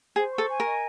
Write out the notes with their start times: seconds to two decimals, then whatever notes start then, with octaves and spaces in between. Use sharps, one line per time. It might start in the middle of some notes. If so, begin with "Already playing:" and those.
0.16 G#4 C5
0.32 C#6
0.38 A4
0.50 G#5
0.60 A#4
0.66 D#5